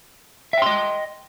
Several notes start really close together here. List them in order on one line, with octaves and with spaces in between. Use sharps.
E5 G5 C6 D#5